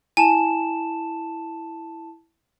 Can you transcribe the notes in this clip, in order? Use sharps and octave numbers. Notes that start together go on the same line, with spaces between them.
E4 G#5 A5 E7